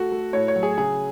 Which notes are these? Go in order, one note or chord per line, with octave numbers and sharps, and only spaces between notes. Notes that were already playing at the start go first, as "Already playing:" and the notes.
Already playing: A3 F#4
A3
A2 C#5
C#5
F#3
G#4
C#3 G#4